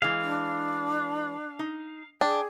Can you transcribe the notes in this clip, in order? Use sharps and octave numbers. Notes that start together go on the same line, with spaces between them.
E3 G#3 F5
D4
D#4
D4 G#4 G5